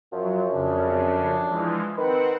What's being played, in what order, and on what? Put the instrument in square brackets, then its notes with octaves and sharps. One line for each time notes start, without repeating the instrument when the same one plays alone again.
[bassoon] F#2 [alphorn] F3 [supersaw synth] F#3
[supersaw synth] F2 C#3 [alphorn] D4
[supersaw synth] E3 F3 G#3
[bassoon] D#3 [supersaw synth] C4 F#5 [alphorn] B4